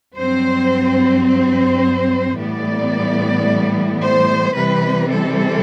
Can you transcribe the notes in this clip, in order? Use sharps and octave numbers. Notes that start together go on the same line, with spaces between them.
G2 F#3 C4 C5
C5
A2 E3 G3 B3 D5
C5
C3 E3 G3 C4 B4
A4